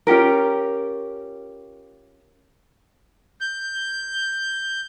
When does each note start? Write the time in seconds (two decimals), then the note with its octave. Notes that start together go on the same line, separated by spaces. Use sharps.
0.07 C#4 F4 G4 A#4
3.41 G6